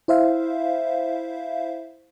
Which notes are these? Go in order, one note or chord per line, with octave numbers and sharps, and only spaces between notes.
E4 C5 E5 F5